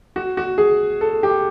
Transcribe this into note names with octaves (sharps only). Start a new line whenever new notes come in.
F#4
F#4
G#4
A4
G4